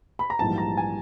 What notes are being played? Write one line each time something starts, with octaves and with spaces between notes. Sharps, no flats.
B5
A#5
A#1 G#2 E3 G3 A#3 A5
A#5
G#5